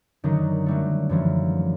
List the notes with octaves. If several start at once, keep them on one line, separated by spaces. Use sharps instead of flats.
F#2 D3 D#3 F#3 D#4
F#3 G3 A3
F#2 E3 F3